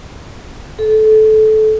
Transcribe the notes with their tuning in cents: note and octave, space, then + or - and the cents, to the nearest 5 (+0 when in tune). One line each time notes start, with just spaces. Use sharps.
A4 -20